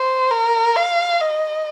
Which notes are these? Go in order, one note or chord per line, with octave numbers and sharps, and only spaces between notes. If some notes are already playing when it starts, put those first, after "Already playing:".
Already playing: C5
A#4
F5
D#5